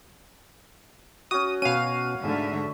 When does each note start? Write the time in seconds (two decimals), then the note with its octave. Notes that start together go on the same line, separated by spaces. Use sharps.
1.31 C#4 F#4 D#6
1.62 B2 C#4 F5 F#5 D#7
2.24 G#2 D3 A3 E5